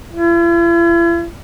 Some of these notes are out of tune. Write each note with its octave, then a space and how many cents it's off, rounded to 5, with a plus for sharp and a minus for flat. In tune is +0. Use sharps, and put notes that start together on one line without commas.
E4 +45